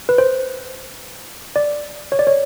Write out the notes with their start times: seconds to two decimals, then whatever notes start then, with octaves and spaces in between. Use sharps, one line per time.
0.09 B4
0.18 C5
1.56 D5
2.12 C#5
2.19 D5
2.27 C#5